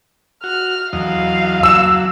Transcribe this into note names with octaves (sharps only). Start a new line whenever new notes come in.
F#4 F6
E2 F#3 D#5 F5
F#3 E6 E7